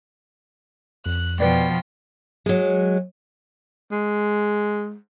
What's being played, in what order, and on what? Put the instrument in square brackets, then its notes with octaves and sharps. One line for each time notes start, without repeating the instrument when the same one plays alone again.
[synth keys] F2 [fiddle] F#6
[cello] B2 F3 [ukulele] B4 D5 [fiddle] G5
[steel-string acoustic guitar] F#3 G#3
[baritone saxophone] G#3